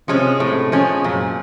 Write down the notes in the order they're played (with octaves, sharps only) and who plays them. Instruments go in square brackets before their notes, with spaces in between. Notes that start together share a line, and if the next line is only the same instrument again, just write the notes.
[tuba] C3 [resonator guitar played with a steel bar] F3 G#3 C#4
[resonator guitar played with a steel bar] A2 [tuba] C3
[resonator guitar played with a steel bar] F3 G#3 C#4
[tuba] F#2 [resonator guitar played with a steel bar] A#2